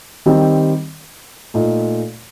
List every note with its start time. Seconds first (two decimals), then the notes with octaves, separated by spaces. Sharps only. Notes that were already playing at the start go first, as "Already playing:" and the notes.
0.26 D#3 G3 C4 D#4
1.54 A#2 A3 D#4